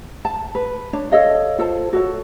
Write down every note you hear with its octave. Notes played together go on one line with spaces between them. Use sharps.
A5
B4
D4 C#5
A4 C#5 D#5 F5
F4 A4 C5 A5
F#4 A4 C#5